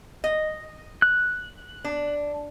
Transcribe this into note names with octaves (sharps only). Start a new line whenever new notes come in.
D#5
F#6
D4